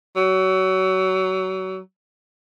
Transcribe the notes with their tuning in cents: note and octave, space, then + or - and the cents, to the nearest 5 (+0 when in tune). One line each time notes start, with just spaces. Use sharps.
F#3 +25